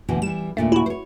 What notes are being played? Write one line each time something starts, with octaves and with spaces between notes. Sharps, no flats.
D2 B2 E3
E3 G3 E7
D#2 A#2 A3 D4
E4 F#4
C5 C#5